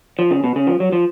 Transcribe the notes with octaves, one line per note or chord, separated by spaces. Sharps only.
F3
C#3
B2
C#3
F3
F#3
F3